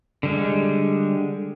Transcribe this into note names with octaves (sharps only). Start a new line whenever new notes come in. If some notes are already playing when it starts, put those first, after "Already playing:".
D3 G3 G#3